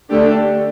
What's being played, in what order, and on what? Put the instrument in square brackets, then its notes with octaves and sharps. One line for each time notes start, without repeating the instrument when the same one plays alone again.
[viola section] D3 A3 D4 G4